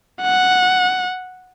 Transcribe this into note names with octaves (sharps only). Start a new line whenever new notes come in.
F#5